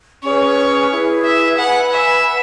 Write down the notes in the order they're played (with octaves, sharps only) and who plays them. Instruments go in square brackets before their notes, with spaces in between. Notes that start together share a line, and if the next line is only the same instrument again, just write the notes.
[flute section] C#4 G#4 B4 [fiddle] C#5
[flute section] E4 G#4 B4
[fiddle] E5
[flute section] B4 G#5 B5 [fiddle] F#5
[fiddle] E5
[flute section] B4 F#5